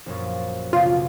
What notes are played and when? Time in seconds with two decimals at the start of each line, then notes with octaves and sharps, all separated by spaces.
0.06 A#1 F#2 A#2
0.73 B1 C#3 F4